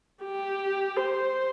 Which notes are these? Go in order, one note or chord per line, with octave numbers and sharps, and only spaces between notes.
G4
C5